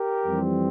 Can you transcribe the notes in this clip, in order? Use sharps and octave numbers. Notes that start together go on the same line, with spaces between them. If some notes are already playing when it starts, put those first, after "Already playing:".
Already playing: G4 A#4
F2 E3 G3 C4